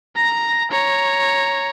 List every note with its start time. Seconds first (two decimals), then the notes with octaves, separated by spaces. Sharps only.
0.16 A#5 A#6
0.71 C#5 A#5